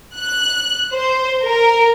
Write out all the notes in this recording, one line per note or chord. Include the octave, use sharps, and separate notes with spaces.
F#6
C5
A#4